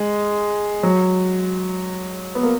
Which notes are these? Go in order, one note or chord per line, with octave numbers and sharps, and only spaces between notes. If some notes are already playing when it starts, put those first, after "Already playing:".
Already playing: G#3
F#3
B3
A#3